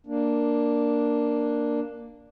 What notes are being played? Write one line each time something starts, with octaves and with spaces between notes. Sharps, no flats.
A#3 D4